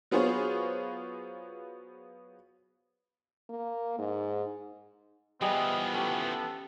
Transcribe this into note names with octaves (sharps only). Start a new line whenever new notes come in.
F#3 B3 F4 G#4 C5 C#5
A#3
G#2
E3 F3 G3 B3 G#4 D#5
C#4 G4 A4